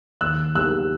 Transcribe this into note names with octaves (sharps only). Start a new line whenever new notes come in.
D#2 E6 F#6
D#3 G3 A#3 E6 F#6